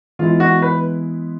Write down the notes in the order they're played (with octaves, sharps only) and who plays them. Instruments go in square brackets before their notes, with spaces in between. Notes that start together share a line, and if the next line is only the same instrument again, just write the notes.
[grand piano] E3 G#3 B3 E4 [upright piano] F4
[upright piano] F#4
B4